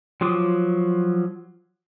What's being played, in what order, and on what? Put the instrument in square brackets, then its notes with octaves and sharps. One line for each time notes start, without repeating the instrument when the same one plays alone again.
[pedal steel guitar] F3 F#3 F4 D6 D#6